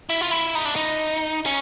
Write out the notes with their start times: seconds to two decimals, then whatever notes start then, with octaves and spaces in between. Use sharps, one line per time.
0.10 E4
0.21 F4
0.31 E4
0.55 D#4
0.65 D4
0.76 D#4
1.46 C#4